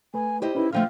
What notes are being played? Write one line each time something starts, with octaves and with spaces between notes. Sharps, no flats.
A3 B4 G#5
E4 G4 C5 D#5
C#4 D#4 E4 B4
D3 F3 A3 F5 G5 F6